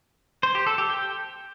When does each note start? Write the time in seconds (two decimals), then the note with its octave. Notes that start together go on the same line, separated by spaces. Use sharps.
0.43 C5
0.55 G4
0.67 A4
0.78 G4
0.90 G5